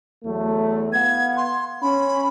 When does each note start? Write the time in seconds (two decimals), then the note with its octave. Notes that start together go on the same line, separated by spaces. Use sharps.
0.24 E2 F#3 A3
0.93 B3 F5 F#5 G#6
1.37 C6
1.82 C#4 B5